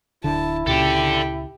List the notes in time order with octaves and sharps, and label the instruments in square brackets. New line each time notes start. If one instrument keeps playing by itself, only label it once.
[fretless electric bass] D1 D3 [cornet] E4 [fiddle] A5
[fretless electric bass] C#2 A#2 C#3 [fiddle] G4 [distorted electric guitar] A4 D5